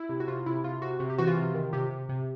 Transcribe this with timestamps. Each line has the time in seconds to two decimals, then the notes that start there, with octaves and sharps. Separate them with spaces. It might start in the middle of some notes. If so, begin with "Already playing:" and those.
Already playing: E4
0.09 C3
0.20 F#4
0.27 C3 F4
0.46 C3 E4
0.64 C3 F4
0.82 C3 F#4
1.00 C3
1.10 G4
1.18 E3 F#4
1.27 F4
1.37 C3
1.54 D#3
1.73 C3 G4
1.91 C3
2.09 C3